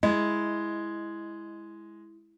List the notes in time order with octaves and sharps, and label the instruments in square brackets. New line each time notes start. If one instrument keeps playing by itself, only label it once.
[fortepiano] G#3 [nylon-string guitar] E4 [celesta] D#5